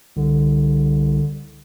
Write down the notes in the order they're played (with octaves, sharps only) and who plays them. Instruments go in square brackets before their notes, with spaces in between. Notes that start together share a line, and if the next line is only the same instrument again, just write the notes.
[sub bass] C2 [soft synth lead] D3